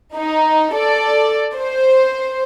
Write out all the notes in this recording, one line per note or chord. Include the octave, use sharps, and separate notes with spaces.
D#4
A4 D5
C5